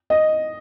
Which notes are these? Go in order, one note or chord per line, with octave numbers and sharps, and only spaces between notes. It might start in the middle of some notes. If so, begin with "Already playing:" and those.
D#5